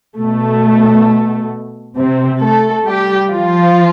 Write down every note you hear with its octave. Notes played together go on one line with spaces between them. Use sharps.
B2 A3
C3 C4
A3 A4
G3 G4
F3 F4